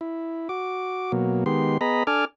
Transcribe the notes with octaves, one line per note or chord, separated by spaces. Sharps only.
E4
F#4 D6
B2 F#3 A#3
D#3 G#3 B3 G4 C6
B3 G#4 D#5 A#5 B5
D4 A4 G#5 D6 F6